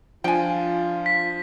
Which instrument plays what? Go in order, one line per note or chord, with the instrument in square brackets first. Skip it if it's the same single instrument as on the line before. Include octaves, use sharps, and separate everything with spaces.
[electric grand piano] F3 D4 [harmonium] F4 [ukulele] G5 G#5
[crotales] B6